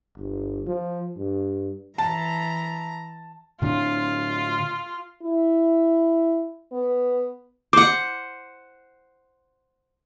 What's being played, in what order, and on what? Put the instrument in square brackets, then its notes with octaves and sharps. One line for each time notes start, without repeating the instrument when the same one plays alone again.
[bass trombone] G1
F3
G2
[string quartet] E3 A#5 [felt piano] A5
[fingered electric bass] A2 D3 D4 [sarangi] F4
[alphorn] E4
B3
[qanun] C5 F#5 [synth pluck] D6